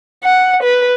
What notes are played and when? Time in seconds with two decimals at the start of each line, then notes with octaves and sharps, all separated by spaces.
0.24 F#5
0.62 B4